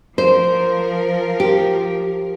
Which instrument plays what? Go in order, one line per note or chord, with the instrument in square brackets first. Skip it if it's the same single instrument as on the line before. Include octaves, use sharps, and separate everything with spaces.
[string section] F3 A#4 [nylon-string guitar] C5
[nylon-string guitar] G4